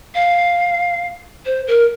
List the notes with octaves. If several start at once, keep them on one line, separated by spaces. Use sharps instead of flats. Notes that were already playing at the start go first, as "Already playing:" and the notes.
F5
C5
A#4